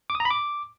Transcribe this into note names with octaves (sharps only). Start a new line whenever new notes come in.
D6
D#6
A#5
B5
D6